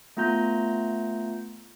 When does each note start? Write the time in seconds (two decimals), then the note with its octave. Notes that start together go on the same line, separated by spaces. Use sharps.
0.17 A3 B3 F4 A#5 G6